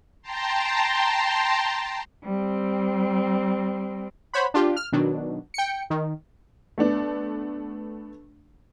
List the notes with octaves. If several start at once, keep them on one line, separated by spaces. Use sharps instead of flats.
G5 A5 A#5 C6
G3 C4
C5 C#5 F#5 B5
D4 F4 G4
F6
B2 D#3 F#3 D4
G5 C#7
D#3
A3 B3 D4